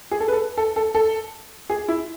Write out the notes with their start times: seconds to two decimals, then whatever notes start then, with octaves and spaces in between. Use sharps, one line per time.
0.11 G#4
0.20 A4
0.28 B4
0.33 A4
0.57 A4
0.76 A4
0.95 A4
1.70 G#4
1.88 E4